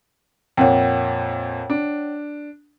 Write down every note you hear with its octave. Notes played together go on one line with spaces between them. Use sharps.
F2 A#2 C#5 F#5 G5
D4